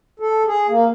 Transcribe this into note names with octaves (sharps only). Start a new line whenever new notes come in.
A4
G#4
A#3